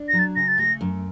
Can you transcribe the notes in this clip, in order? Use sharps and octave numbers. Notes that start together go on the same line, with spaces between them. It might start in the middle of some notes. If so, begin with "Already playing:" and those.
Already playing: D4
F#3 A#6
A6
C#3 A#6
A6
A3 A#6
F#2